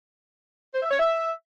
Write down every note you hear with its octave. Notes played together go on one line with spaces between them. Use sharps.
C5
E5
C#5
E5